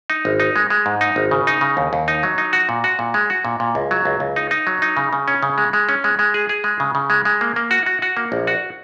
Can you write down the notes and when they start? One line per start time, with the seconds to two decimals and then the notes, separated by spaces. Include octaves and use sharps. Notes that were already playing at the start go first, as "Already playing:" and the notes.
0.10 D#4
0.25 G#1
0.40 D#4
0.56 G#3
0.70 G#3
0.86 G#2
1.01 D#4
1.16 G#1
1.31 C#3
1.47 D#4
1.61 C#3
1.77 D#2
1.93 D#2
2.08 D#4
2.23 F#3
2.38 D#4
2.53 F#4
2.69 A#2
2.84 F#4
2.99 A#2
3.14 G#3
3.30 F#4
3.45 A#2
3.60 A#2
3.75 C#2
3.91 F#3
4.05 C#2
4.20 C#2
4.36 D#4
4.51 D#4
4.67 F#3
4.82 D#4
4.97 C#3
5.13 C#3
5.28 C#4
5.43 C#3
5.58 G#3
5.73 G#3
5.89 C#4
6.04 G#3
6.19 G#3
6.34 G#4
6.49 G#4
6.64 G#3
6.80 C#3
6.95 C#3
7.10 G#3
7.25 G#3
7.41 A#3
7.56 A#3
7.71 F#4
7.86 F#4
8.02 F#4
8.17 A#3
8.32 A#1
8.47 F#4